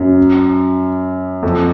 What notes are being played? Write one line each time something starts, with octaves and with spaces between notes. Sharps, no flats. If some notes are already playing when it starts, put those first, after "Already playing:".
Already playing: F#2
F2